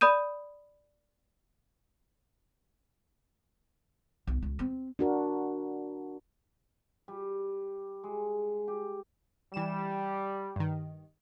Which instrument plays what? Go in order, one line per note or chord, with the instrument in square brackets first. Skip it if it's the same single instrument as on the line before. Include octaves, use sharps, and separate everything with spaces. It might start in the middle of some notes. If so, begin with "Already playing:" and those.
[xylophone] D5 B5 D#6 G6 D#7
[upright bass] B1
C#2
C4
[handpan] D4 F#4 A#4
[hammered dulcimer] G3
G#3
G4
[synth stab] E3 E7 [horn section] G3
[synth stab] G2 D#3